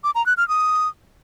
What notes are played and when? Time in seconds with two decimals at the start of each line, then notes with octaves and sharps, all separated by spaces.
0.04 D6
0.15 A#5
0.26 F#6
0.37 F6
0.48 D#6